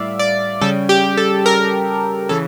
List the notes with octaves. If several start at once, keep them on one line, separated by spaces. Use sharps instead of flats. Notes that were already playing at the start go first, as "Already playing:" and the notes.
Already playing: A2 G3 D5 E5 F5
D5
C#3 G3 A4
G4
A4
A#4
C#3 E3 A4